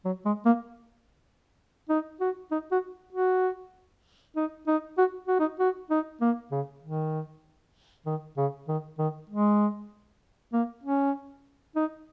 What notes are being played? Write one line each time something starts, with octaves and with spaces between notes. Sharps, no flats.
F#3
G#3
A#3
D#4
F#4
D#4
F#4
F#4
D#4
D#4
F#4
F#4
D#4
F#4
D#4
A#3
C#3
D#3
D#3
C#3
D#3
D#3
G#3
A#3
C#4
D#4